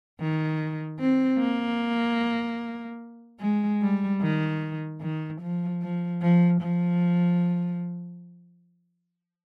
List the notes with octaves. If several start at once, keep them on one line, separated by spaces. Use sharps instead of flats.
D#3
C4
A#3
G#3
G3
D#3
D#3
F3
F3
F3
F3